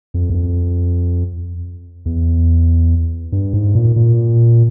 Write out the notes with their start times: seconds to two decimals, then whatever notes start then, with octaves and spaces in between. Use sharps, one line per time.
0.14 F2
0.30 E2
0.34 F2
2.05 E2
3.32 G2
3.53 G#2
3.75 A#2
3.96 A#2